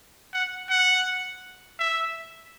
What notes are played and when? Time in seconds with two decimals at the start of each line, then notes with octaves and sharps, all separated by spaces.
0.33 F#5
0.69 F#5
1.79 E5